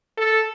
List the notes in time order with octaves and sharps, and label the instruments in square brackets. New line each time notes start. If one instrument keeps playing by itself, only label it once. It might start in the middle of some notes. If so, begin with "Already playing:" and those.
[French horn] A4